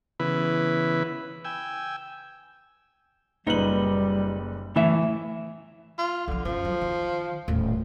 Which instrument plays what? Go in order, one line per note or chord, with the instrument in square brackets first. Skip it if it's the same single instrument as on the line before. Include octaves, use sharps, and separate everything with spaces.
[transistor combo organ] C#3 E3 B3 E4 B4
G5 G#5 E6
[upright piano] F#1 B4 F#7 [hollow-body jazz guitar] A#2 D#4 [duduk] G3
[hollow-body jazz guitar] E2 A2 E5 [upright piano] E3
[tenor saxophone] F4
[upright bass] B1 F3 [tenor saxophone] D3
[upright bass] A1 F#2 [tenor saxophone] F3
[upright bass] F#3
D#3
D#1 A2